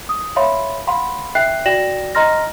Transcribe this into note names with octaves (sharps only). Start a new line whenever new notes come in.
D#6
C#5 E5 F5 B5 C6
F5 F#5 B5 C6
E5 G5 F#6 C7
F#4 D5 G5 A#6 E7 F#7
D#5 A#5 C6 F6 A#6